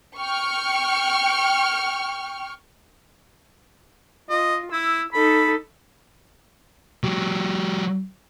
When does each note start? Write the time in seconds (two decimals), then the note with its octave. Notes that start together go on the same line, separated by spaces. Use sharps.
0.18 G5 C#6 F6
4.30 F4 D#5
4.72 E4 E6
5.13 D#4 A4 B5
7.04 F#3 G4